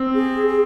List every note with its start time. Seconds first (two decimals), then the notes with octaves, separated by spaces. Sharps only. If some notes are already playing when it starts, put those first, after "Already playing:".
Already playing: C4
0.15 G#4
0.47 G#4